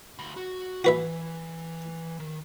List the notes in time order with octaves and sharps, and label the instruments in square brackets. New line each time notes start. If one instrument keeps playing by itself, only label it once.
[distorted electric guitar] D2 B5
F#4
[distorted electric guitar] E3 [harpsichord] F#4 B4 E5
[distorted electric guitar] D#3